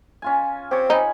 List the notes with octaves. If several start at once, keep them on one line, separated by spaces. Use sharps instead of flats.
C#4 F4 G#5
C4 G4 C#5
D#4 G#5 B5